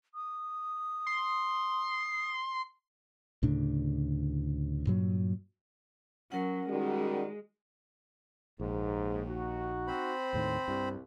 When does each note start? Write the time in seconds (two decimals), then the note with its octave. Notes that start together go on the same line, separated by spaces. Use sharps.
0.15 D#6
1.07 C6
3.43 D2 A2 C#3 D4
4.87 G2 A#2 F#3
6.32 F#3 C#4 A#4 F#5
6.70 D#3 G3 G#3 F#4
8.60 A#1 D#2 G#2
9.28 D#4 F#4
9.87 C4 C5 B5
10.33 D#2 A2 D#3
10.68 C2 G2